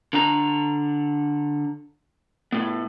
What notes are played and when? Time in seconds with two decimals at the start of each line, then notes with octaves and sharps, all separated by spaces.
0.13 D3 D4 A#5
2.52 A2 B3